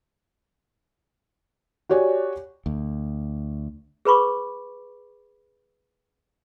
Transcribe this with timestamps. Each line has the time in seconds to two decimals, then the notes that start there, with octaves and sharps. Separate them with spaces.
1.89 F#4 G4 C#5 D5 G#5
2.66 D2
4.05 G#4 B4 B5 C#6 D6